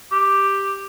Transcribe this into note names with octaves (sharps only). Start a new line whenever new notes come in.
G4